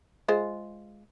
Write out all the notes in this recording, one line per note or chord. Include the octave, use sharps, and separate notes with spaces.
G#3 F4 C5